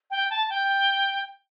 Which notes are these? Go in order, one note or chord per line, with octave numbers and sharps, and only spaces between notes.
G5
A5
G5